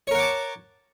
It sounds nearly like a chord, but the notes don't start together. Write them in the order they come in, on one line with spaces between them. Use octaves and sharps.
C#5 A#4 F#5 D6 A5